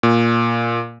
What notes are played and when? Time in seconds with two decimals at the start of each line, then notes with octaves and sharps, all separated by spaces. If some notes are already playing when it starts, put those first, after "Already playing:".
0.03 A#2